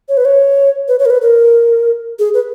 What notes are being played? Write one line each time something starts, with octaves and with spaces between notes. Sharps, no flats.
C#5
B4
C#5
B4
C#5
A#4
B4
A#4
G#4
B4